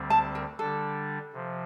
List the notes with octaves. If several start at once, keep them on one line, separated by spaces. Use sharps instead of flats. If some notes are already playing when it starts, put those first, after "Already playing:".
Already playing: D2 D3 G3 C4
A5
A#4
D3 G3 D4 A4
C3 F3